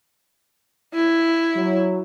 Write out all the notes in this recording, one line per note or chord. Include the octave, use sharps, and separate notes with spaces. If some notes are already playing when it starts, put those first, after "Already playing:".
E4
F#3